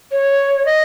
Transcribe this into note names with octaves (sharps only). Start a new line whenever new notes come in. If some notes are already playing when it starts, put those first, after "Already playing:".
C#5
D#5